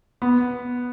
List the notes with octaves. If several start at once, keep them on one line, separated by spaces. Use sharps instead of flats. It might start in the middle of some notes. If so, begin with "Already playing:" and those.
B3